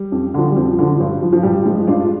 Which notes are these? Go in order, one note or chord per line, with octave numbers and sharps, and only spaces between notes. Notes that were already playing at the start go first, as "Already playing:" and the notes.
Already playing: G3
F2
D3 F3
G3
F2 F3
D3 F3
G2
F3
F3
G2 G3
F3 G#3
G2 D4 F4